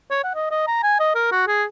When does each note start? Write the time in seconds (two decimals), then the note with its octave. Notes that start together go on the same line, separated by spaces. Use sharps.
0.11 C#5
0.24 F#5
0.35 D#5
0.51 D#5
0.67 A#5
0.83 G#5
0.99 D#5
1.15 A#4
1.32 F#4
1.47 G#4